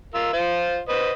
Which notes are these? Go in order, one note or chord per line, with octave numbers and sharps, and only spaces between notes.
F4 A#4 E6
F4 C5
B4 C5 D#5